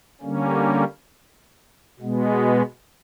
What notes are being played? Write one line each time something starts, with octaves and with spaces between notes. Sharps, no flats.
D3 G3 A#3 C#4
B2 G#3 B3